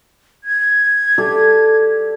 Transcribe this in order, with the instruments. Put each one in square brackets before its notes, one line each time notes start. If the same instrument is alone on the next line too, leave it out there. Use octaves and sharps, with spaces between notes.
[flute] G#6
[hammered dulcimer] G4 A4 D5